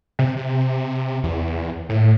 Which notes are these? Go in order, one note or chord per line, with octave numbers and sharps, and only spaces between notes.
C3
C3
E2
A2